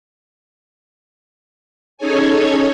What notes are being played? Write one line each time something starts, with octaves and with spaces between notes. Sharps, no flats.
C#4 D#4 G#4 A4 C#5 G#5